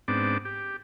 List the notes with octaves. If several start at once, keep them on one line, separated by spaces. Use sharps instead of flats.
G#2 B3 C4 D4 D6
G4